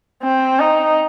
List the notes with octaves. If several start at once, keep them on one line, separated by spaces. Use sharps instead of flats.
C4
D#4